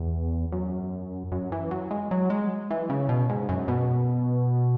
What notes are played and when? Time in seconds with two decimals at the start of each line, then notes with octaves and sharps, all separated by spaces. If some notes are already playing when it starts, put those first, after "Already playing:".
Already playing: E2
0.52 F#2
1.32 F#2
1.52 E3
1.71 F#3
1.91 G#3
2.11 F#3
2.30 G#3
2.71 E3
2.90 C#3
3.09 B2
3.29 G#2
3.49 F#2
3.68 B2